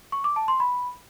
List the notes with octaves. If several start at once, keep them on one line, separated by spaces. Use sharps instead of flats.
C#6
D6
A5
C6
B5